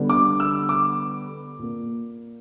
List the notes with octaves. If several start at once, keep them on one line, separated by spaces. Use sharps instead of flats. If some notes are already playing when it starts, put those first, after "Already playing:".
Already playing: D3 G3 B3
D6
E6
D6
A#2 A#3